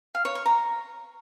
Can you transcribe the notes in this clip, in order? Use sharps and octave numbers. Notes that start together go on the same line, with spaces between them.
F5
C#5
C#6
A#5